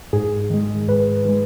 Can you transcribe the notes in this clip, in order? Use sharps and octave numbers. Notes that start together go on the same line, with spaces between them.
G#2 G#4
D#3 G#3
G#2 B4
D#3 G#3